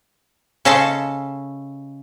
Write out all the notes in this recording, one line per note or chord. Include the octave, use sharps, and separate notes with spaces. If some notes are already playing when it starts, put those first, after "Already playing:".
C#3 C#4 A4 D#5 A5 C6